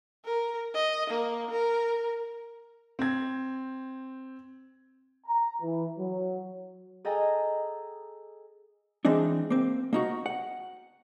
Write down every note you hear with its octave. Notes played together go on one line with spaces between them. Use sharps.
A#4
D#5
A#3
A#4
C4 G#6
A#5
E3
F#3
G#4 A4 D#5 G5 G#5 A#5
E3 G#3 C4 D4 D#4
A#3 C4
A#3 D#4 F#4
F#5